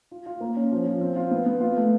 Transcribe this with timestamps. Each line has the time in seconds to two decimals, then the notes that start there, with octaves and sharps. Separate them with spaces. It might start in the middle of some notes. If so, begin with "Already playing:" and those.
0.11 F4
0.26 F4
0.41 A#3
0.56 C#4
0.72 F3
0.86 F3
1.01 C4
1.16 F4
1.31 B3
1.46 B3
1.60 F4
1.77 A3